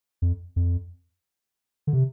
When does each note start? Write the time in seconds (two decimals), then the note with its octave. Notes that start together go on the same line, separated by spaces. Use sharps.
0.22 F2
0.56 F2
1.87 D3
1.93 C3